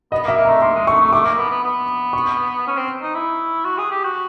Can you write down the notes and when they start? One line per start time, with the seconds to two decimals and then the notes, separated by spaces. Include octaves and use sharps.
0.12 B3 D#5
0.25 A#3
0.28 E5
0.36 A#3
0.45 A3 A#5
0.62 A#3 C6
0.75 G#3
0.87 A3 C#6
1.00 A3
1.13 A3 D6
1.25 A#3
1.38 B3
1.50 B3
1.63 B3
2.13 C#6
2.67 C#4
2.77 C4
3.02 D#4
3.14 E4
3.65 F#4
3.78 G#4
3.91 G4
4.03 F#4